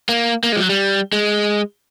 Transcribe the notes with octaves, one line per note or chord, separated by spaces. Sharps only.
A#3
A#3
G#3
F3
F#3
G3
G#3